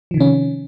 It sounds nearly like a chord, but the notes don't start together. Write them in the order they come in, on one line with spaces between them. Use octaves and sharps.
F3 D#3 C3 C#4